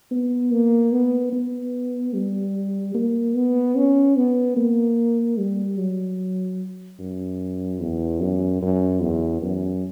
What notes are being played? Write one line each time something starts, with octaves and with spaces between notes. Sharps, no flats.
B3
A#3
B3
B3
G3
A#3
B3
C#4
B3
A#3
G3
F#3
F#2
E2
F#2
F#2
E2
F#2